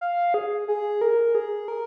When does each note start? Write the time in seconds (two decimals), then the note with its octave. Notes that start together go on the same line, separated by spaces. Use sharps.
0.01 F5
0.34 G#4
0.68 G#4
1.01 A#4
1.35 G#4
1.68 A#4